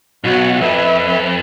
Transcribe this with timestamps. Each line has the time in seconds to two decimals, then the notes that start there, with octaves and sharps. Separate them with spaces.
0.24 B1 F#4 F#5
0.61 F2 B4 E5